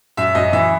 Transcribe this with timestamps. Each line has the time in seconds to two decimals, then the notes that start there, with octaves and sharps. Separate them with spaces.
0.17 F#2 E5
0.35 F#2 D#5
0.53 E3 E5